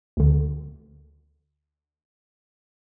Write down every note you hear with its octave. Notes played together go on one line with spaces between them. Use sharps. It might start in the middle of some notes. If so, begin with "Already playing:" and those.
D2 D3